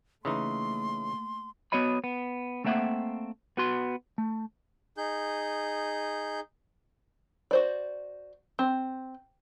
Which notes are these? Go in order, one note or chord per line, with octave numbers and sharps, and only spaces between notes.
C#3 E3 A3 A#3 D#4 C6
B3 F#4 C#5 D#5 B5
B3
A3 A#3 C4 E5 F#5
B3 F#4 C6
A3
D#4 G#4 G6
F#4 C5 D5
C4